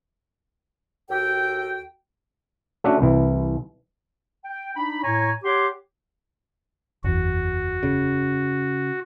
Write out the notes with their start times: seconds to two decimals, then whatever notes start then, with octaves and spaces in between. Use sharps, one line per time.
1.10 D#2 F#4 A4 G5
2.84 A3 C#4 D4 F#4 E5 F#5
3.01 C2 E3
4.45 G5
4.77 D4 D#4 B5
5.03 A2 C#5 G#5 A#5 C#6
5.44 G4 C#5 F#5 C6 D6
7.04 F#1 E2 F#4
7.83 C#3